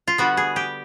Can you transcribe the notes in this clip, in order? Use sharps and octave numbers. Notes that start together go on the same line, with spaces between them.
F4
D3 G3 B3 F#4
G#4
G4